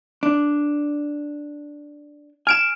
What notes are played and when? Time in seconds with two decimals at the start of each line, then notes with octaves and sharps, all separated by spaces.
0.23 D4
2.47 G#5 F6 D7 E7